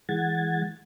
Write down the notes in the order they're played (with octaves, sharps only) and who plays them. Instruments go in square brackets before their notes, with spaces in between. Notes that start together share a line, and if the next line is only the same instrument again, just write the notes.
[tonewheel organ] E3 G#3 F#5 G#6 A6